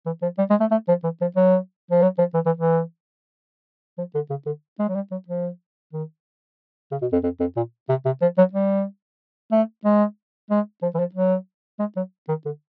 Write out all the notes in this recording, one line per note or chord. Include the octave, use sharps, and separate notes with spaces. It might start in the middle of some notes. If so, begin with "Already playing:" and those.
E3
F3
G3
G#3
A3
A3
F3
E3
F3
F#3
F3
F#3
F3
E3
E3
E3
F3
D3
C#3
D3
G#3
F#3
G3
F#3
F3
D#3
C#3
B2
F2
F2
F2
A#2
C3
C3
F3
F#3
G3
A3
G#3
G#3
F3
E3
F3
F#3
G#3
F#3
D#3
D3